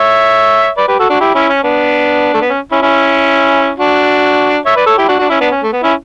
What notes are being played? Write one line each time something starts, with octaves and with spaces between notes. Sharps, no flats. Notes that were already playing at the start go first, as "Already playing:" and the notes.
Already playing: C#5 E5
B4 D5
G4 B4
F#4 A4
D4 F#4
E4 G4
C#4 E4
C#4
B3 D4
A3
B3
C#4
C#4 E4
C#4 E4
D4 F#4
C#5 E5
B4 D5
A4 C#5
E4 G4
D4 F#4
D4 F#4
C#4 E4
B3 D4
C#4
A3
B3
C#4 E4